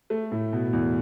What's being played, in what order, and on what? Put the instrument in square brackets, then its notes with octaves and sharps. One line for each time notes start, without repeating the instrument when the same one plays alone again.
[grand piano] A3
A2
B2
E2